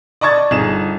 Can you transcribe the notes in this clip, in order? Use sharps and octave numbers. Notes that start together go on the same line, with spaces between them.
D5 D#5 A5 C#6 G#6 A6
G1 D#4 G#4 E7